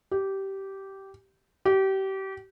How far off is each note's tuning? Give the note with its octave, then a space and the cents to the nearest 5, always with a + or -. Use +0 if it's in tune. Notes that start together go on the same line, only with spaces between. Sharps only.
G4 -15
G4 -30